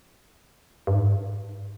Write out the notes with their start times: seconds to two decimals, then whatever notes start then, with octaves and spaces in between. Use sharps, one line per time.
0.87 G2
0.94 G#2